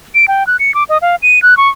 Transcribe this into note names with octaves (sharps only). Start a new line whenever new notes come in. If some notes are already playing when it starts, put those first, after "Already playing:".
D7
G5
F#6
C#7
D6
D#5
F5
D#7
F#6
C#6